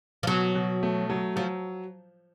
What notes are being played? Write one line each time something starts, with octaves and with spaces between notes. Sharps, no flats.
F3
B2 F#3
B2
A3
F#3
F3 F#3